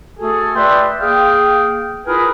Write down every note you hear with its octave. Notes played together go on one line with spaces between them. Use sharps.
A3 F#4 G#4 A4
B4 D5 E5 G5 C6
A#3 G#4 F5 G5
E4 F4 G#4 A#4 B4